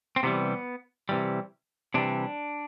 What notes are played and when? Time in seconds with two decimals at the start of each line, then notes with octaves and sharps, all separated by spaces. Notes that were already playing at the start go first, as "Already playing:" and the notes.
0.16 C4
0.23 C3 E3 G3 B3
1.09 C3 E3 G3
1.94 C3 E3 G3 D4